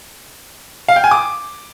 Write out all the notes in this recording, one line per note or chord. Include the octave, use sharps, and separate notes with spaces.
F5
G5
G#5
D6